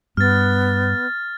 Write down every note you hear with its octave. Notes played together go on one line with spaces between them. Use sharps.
G2 B3 F6 A6